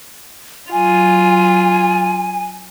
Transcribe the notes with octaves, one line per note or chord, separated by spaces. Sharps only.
F#3 F4 G#5